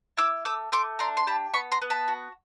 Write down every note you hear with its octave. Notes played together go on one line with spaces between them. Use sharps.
E4 D6 E6
A3 D6 E6
A3 C6 D6
D4 A#5 C6
C6
G4 A5 B5
B3 B5 C#6
A#5 C6
B3
A5 B5
F#4